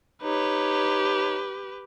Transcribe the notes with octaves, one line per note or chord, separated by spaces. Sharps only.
D#4 G4 B4 C#5